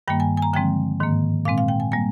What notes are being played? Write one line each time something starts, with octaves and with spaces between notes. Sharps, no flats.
G2 D#3 G3 A#3 G5
G#5
G#5
A#5
D3 F3 G#3 C4 G5
G#2 D#3 A#3
A#2 G#3 C4 F5
F5
G5
G#5
G3 A#3 G#5